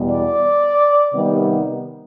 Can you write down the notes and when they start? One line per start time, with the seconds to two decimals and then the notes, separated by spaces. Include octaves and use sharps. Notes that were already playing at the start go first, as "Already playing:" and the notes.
Already playing: E2 B2 G3 B3
0.11 D5
1.13 C3 D#3 G3 B3